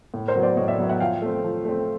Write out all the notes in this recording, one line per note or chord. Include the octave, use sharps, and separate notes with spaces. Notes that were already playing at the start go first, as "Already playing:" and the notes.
A2
A#4 C5
F#3 B3
C5 D5
A2 C#5 D#5
D5 E5
F#3 B3
E5 F#5
F3 F5 G5
A3 C4
F3
A3 C4